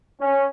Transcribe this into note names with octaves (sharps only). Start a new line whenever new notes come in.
C#4